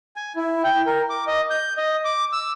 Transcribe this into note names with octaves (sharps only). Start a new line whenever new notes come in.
G#5
E4
G5
A#4
D6
D#5
G6
D#5
D6
E6